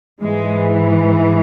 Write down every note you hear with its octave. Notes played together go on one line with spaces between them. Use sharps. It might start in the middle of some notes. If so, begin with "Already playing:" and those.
G#2 E3 G#3